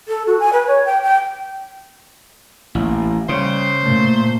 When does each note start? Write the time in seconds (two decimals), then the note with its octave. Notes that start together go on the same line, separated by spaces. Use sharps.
0.08 A4
0.27 F#4
0.40 G#5
0.53 B4
0.67 C#5
0.85 G5
1.02 G5
2.75 A1 A#3
3.29 C#3 G3 C5
3.82 A#2 A3